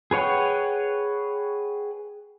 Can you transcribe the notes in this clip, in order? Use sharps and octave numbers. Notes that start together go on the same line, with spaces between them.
G#4 B4 C#5 F#5 G5